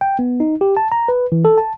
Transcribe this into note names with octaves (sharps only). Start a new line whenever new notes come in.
G5
B3
D#4
G4
A5
A#5
B4
E3
A4
A5